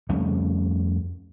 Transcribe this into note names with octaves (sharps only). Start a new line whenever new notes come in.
F2 C#3 G3 A3